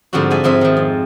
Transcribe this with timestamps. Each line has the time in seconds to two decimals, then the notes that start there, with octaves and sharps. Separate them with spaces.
0.13 G#2 D3 F3 G3 C4 F#4
0.30 F#4 G#4 A4 E5 G#5
0.44 G#2 F3 C4 E5 G#5
0.61 D#3 F3
0.77 F2